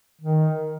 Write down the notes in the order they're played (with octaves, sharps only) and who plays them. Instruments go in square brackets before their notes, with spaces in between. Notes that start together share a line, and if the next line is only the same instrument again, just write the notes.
[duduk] D#3